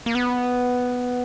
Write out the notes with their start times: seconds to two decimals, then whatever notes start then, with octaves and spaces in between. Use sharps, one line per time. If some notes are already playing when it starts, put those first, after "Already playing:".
0.06 A#3
0.15 B3